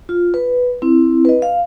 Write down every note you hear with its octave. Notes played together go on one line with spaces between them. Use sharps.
F4
B4
C4 E4
B4 D#5
F5